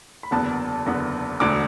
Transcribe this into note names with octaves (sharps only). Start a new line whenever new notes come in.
B5
F#1 E2 D3 B3 A5
F#1 E2 D3 B3
E1 D2 D3 D6